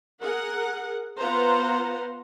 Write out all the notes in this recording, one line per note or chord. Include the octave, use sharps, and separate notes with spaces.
G#4 A#4 F#5
B3 F4 B4 C5 F#5 A#5